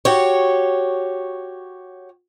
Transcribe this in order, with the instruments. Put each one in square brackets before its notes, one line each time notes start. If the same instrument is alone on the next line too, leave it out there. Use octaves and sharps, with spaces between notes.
[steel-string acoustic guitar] F#4 G4 C#5